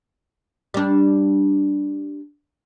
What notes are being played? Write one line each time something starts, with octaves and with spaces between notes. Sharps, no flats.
G3 D4